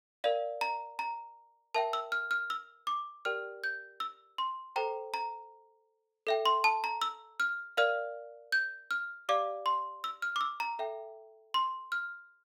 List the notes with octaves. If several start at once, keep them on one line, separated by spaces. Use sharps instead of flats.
A#4 D5 F5
A#5
A#5
A#4 E5 G5 A5
E6
F6
F6
E6
D6
G4 A#4 D5 G5 F6
G6
E6
C6
A4 C5 G5 A#5
A#5
A4 E5 G5
C6
A5
A#5
E6
F6
A#4 D5 F5 F6
G6
F6
G4 D5 F5 D6
C6
E6
F6
D6
E6
A#5
A4 E5 G5
C6
F6